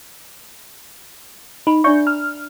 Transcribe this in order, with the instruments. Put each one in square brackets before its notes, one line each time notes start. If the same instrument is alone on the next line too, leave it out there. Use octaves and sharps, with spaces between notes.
[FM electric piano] D#4 [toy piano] B5
[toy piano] D4 D5 E5 [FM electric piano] C#6 G6
[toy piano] A#5 [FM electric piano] F6